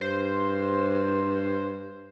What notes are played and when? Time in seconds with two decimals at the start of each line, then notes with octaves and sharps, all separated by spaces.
0.01 G2 C5